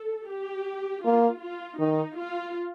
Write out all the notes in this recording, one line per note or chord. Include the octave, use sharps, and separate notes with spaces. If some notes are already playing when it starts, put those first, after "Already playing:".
Already playing: A4
G4
A#3 F4
F4
D#3 D#4
F4